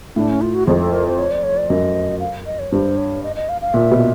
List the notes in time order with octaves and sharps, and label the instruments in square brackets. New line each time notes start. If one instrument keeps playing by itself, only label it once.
[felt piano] A2 [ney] D4
[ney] C#4
F4
F#4
[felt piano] F2 [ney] G#4
[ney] A4
A#4
C5
C#5
D5
C#5
D5
[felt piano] F#2 [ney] D#5
[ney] F5
D#5
C#5
[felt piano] G2 [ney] C5
[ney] C#5
D#5
D#5
F5
F5
[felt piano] A#2 [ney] E5
[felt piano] B2